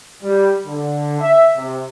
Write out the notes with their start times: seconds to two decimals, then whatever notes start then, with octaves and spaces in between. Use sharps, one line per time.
0.23 G3
0.66 D3
1.21 E5
1.56 C3